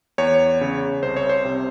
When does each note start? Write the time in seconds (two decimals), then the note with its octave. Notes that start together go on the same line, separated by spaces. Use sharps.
0.18 E2 C#5
0.61 C#3
1.02 C2 C5
1.17 C#5
1.29 C5
1.45 C3